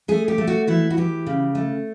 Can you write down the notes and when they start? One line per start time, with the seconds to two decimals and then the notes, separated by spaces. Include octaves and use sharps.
0.08 A3 G#4
0.28 G4
0.38 A3
0.47 F#4
0.67 E3 E4
0.90 F#4
0.97 E3 G4
1.26 C#3
1.55 A3